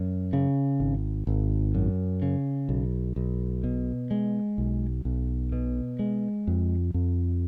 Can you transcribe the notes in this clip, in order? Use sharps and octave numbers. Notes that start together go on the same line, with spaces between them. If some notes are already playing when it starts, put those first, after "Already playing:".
Already playing: F#2
C#3
G#1
G#1
F#2
C#3
B1
B1
B2
G#3
B1
B1
B2
G#3
F2
F2